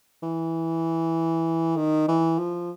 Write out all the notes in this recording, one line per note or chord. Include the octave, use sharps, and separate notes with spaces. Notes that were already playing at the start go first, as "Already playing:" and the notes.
E3
D#3
E3
F3